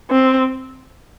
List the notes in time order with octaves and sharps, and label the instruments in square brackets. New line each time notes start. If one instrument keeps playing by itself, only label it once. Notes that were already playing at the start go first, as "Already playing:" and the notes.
[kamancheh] C4